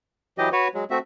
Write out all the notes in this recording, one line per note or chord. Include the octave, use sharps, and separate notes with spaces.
E3 F#3 G4 D#5
F#4 B4 C#5
F#3 G#3
A3 C4 F#4 E5